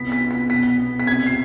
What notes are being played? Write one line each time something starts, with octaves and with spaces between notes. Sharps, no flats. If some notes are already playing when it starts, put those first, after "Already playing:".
Already playing: C2 B3 B6
B6
B3
B6
B2 B6
B3
B6
C3 G#6
C7